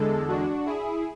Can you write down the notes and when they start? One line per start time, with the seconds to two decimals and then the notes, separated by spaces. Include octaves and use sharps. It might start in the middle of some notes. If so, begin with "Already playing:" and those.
Already playing: E2 D3 G#3 A4
0.28 D4 F#4
0.65 E4 G#4